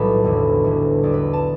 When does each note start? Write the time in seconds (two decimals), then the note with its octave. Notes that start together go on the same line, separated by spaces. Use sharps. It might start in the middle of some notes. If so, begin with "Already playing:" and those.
Already playing: B1 A2 E3 G3 A5 B5
0.24 E1 E2 D3
0.64 E1 E2 D3
1.03 E2 B2 G3 D5
1.14 B4
1.33 A5